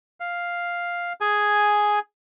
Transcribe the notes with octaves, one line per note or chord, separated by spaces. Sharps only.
F5
G#4 G#5